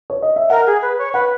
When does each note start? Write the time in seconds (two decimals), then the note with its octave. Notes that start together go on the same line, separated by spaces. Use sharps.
0.10 C#5
0.22 D#5
0.36 E5
0.50 A#4 F#5
0.66 G#4
0.82 B4
0.98 C#5
1.13 B4 F#5